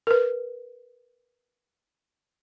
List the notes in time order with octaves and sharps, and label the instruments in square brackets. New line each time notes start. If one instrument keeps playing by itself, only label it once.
[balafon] A#4 B4